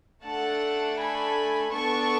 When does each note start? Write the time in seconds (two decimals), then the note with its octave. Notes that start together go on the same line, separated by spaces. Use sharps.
0.24 A3 D4 A4 F#5 A5
0.98 G#5 B5
1.72 B3 D4 A4 A5 C#6